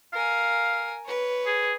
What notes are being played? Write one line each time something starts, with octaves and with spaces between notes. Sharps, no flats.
A#4 F5 G#5
B4 C#5
G#4